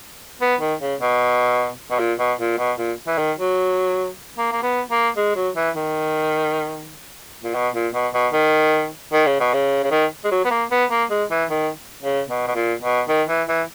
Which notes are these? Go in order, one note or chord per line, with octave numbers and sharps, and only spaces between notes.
B3
D#3
C#3
B2
B2
A#2
B2
A#2
B2
A#2
E3
D#3
F#3
A#3
A#3
B3
A#3
G#3
F#3
E3
D#3
A#2
B2
A#2
B2
B2
D#3
D#3
C#3
B2
C#3
C#3
D#3
G#3
F#3
B3
A#3
B3
A#3
G#3
E3
D#3
C#3
B2
B2
A#2
B2
D#3
E3
E3